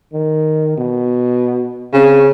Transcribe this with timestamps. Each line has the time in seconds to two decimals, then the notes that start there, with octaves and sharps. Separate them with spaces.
0.13 D#3
0.77 B2
1.93 C#3 C4